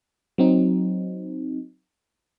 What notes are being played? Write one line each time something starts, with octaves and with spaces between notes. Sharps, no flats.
F#3 C4 D#4